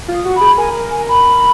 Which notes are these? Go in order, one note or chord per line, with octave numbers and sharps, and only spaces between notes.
F4
D#6
F#4
B5
G#4
A#4 G#5
G#5
B5